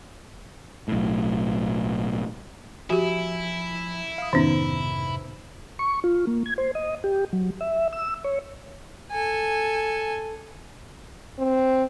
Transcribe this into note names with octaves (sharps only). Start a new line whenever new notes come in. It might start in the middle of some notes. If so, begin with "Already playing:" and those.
B1 A2
F3 E4 F#4 G4 E5 G#5
F5 D#6
F2 G#2 C3 D#3 B3 C#4 D#4 C5
C#6
F4
A#3
G#6
C5
D#5
G4
F#3
E5
E6
C#5
A4 G#5
C4